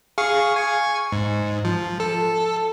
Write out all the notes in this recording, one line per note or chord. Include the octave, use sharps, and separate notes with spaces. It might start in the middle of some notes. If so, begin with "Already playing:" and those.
G#4 F5 C#6
G#5 C#6
G#2
F3
A4